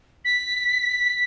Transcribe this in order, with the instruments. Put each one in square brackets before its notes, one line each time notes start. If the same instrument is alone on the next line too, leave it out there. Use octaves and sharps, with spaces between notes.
[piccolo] B6